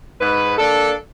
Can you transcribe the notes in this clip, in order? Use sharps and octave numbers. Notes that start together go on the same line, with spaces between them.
G#2 B4
A#3 D4 A4